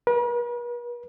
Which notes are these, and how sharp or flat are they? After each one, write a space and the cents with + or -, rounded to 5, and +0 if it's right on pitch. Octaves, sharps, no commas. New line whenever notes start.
B4 -45